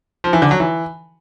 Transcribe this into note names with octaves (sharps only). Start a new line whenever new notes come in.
F3
E3
D3
F#3
E3